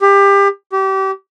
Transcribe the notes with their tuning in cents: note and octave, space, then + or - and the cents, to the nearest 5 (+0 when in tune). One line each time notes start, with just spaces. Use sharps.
G4 +25
G4 -30